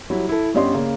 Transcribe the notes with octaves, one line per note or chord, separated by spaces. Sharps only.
F#3 G3 E4
E4 A4
G2 B3 C#4 G4 D#5 C6
C#3 A#3